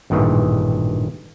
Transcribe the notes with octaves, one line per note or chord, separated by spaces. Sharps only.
A1 G2 A#2 D#3 E3 G#4